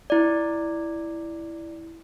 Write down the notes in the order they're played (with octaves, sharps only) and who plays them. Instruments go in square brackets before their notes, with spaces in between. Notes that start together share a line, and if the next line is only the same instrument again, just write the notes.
[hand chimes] E4 D5